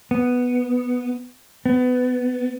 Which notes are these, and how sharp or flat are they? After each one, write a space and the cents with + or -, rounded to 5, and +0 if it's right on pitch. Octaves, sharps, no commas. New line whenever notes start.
B3 +0
B3 +20